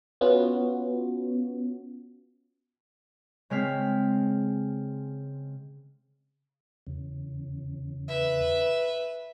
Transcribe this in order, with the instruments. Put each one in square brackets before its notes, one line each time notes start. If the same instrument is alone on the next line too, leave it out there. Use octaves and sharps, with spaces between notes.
[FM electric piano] B3 C#4 F4 F#4
[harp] C#3 G#3 C4 F6 B6
[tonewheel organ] E2 C#3
[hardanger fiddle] B4 E5